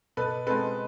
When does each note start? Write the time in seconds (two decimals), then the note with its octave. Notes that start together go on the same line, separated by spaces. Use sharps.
0.17 B2 A4 B4
0.47 G#3 C4 A4 B4